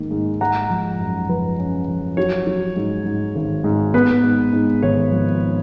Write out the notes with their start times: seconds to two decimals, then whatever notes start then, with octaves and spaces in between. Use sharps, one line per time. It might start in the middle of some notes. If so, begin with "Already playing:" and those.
Already playing: G#2 D#3 A#3
0.11 G#2
0.41 G#3 F#5 A#5
0.70 F3
1.00 F#2
1.29 F3 B4
1.59 C#4
1.88 F3
2.17 F#3 C#5
2.47 F#3
2.76 G#2
3.06 G#2
3.35 G#1
3.64 G#2
3.94 B3 B4
4.23 G#2
4.53 G#2
4.82 G#1 C#5
5.11 F3